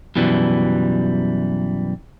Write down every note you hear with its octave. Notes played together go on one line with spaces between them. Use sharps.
F#2 B2 E3 G3